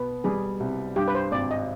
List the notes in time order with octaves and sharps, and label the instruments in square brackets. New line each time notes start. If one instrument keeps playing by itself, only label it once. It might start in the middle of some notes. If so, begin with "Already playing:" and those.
Already playing: [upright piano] B2 B3 [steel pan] B4
[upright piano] G3 [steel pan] G#4
[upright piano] C2
[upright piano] G2 [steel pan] G4
[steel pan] B4
C5
[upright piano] G#1 [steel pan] D5
[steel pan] D#5